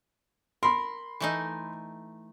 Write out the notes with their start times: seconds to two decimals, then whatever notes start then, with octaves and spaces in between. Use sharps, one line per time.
0.63 A#4 B5 C6
1.20 E3 A3 D#4